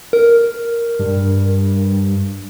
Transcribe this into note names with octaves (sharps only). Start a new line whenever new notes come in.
A#4
G2